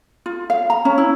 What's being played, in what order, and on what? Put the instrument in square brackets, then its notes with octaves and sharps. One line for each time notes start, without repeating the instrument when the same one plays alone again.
[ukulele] F4
F5
A#5
C#4
E4